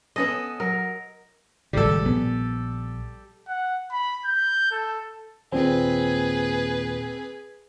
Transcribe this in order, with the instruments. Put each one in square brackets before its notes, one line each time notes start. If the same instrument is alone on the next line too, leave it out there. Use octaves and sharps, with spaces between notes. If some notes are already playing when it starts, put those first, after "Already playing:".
[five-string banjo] B3 C#4 A4 [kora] D#5
[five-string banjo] F#3 [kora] A#4
[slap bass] G#1 A2 C#3 [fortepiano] G3 A4
[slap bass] A#1 B3
[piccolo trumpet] F#5
B5
G6
A4
[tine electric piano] D#2 A#2 [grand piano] C4 [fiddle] G#4 B4